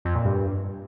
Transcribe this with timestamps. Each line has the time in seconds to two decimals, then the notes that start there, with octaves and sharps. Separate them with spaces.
0.05 F2
0.15 A#2
0.25 G2